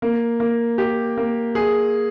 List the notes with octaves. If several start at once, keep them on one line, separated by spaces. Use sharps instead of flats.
A#3
A#3
G4
A#3
G#4